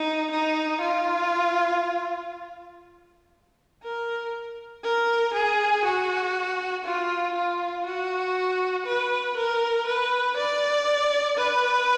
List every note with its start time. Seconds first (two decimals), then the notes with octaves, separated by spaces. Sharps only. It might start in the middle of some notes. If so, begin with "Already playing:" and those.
Already playing: D#4
0.31 D#4
0.81 F4
3.83 A#4
4.84 A#4
5.34 G#4
5.85 F#4
6.85 F4
7.35 F4
7.86 F#4
8.86 B4
9.37 A#4
9.87 B4
10.37 D5
11.38 B4